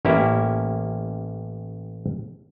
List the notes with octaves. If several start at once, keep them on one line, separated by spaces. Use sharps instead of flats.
A1 A#3 C#4 E4 G4